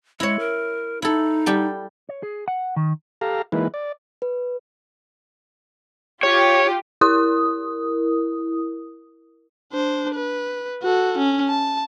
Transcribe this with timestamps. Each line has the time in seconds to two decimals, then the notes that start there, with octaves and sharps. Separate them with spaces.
0.20 G#3 E4 C#5
0.39 A#4
1.02 D#4 E4 A4
1.46 G3 G4 A4
2.09 C#5
2.23 G#4
2.48 F#5
2.76 D#3
3.21 G4 A4 F5 A#5
3.52 E3 G#3 A#3 D#4 E4 B4
3.74 D5
4.22 B4
6.23 F4 G4 C#5
7.01 E4 A#4 D#6
9.73 D4 C5
10.15 B4
10.83 F#4 A4
11.18 C#4
11.49 A5